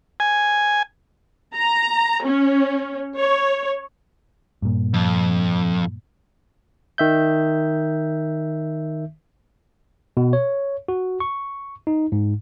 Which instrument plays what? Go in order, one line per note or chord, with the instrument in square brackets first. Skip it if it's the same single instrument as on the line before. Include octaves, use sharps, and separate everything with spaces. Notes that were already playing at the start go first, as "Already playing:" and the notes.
[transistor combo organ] G#5
[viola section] A#5
C#4
C#5
[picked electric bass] G2 A#2
[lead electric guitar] F2
[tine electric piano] D#3 E5 G6
B2
C#5
F#4
C#6
D#4
G#2